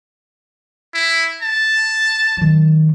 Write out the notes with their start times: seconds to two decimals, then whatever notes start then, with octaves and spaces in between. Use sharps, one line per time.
0.94 E4
1.42 A5
2.37 D#3 F#3